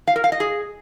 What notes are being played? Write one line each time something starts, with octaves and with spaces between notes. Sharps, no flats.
F5
A#4
F5
D#5
G#4